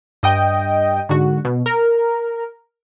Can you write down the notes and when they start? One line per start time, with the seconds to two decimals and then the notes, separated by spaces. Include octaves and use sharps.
0.23 G2 D#5 G5
1.09 G#2 D3 F#4
1.45 B2
1.66 A#4